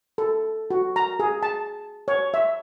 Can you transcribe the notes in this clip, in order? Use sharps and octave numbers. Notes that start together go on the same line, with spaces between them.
A4
F#4
A#5
G#4
A5
C#5
E5